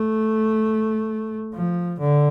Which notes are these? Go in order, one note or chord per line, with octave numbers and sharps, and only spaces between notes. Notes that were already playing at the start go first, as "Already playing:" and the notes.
Already playing: A3
F3
D3